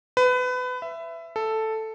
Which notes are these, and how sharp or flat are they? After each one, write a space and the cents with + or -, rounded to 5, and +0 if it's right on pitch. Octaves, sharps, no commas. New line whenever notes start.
B4 +25
E5 +15
A4 +0